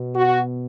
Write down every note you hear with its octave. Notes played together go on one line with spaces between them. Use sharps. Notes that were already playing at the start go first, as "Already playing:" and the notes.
Already playing: B2
F#4